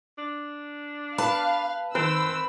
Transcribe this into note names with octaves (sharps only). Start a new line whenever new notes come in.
D4
B4 F5 A5
D#3 C4 B4 E6